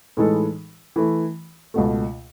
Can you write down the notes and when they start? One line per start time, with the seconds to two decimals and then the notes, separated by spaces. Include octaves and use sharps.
0.17 A2 E3 G#3 D#4 A4
0.96 E3 A3 E4
1.74 C#2 B2 A3